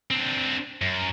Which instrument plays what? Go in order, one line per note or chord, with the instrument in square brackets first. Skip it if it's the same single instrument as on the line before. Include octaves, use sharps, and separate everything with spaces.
[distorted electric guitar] C4 D4
F#2